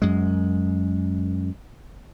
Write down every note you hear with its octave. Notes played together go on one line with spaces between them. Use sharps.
F#2 G#3